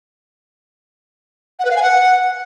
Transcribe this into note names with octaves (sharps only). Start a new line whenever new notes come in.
F#5
B4
F5
G#5
F#5